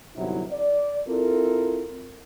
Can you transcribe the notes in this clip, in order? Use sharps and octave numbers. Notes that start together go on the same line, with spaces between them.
G1 C3 F#3 D#4 E4
D5
C4 E4 F4 A4 A#4